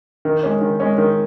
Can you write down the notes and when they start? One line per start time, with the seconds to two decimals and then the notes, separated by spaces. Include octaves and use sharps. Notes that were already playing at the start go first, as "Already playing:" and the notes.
0.25 D#3
0.43 G#3 C#4
0.62 D#3
0.80 G#3 C#4
0.98 D#3